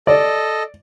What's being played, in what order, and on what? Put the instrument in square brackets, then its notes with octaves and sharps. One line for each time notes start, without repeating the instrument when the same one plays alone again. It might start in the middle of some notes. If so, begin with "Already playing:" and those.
[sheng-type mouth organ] A4 D#5 [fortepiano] D5